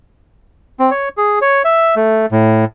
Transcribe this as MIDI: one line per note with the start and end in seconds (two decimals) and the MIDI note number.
0.79 0.90 60
0.91 1.09 73
1.17 1.39 68
1.42 1.63 73
1.65 1.95 76
1.96 2.26 57
2.32 2.65 45